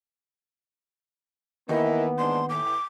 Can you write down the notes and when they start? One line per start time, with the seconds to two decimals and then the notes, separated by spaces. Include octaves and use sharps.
1.69 D#2 E3 B3 E4 A#4 D#5
2.18 G#2 E3 D4 C6
2.49 A2 E3 D6